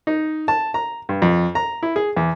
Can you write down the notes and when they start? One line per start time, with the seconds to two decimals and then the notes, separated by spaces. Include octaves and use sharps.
0.07 D#4
0.48 A5
0.74 A#5
1.09 G2
1.22 F2
1.55 A#5
1.83 E4
1.96 G#4
2.17 E2